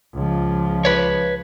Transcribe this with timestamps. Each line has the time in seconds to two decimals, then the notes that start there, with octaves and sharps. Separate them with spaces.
0.14 C#2 F3
0.85 B4 C#5